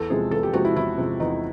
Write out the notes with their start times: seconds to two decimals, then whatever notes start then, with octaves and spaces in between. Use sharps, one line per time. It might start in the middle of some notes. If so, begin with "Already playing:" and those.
Already playing: E2 A4
0.10 C3 F3 G#3 G#4
0.31 E2 A4
0.43 G4
0.53 C3 F3 G#3 F#4
0.65 E4
0.76 E2 E4
0.98 C3 F3 G#3
1.20 E2 D#4